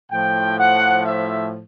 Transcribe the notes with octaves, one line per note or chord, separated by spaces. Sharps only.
A2 F3 G5
F#5
E5